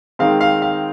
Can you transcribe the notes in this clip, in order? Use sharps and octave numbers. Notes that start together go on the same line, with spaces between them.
D#3 G#3 C4 F5
F5
F5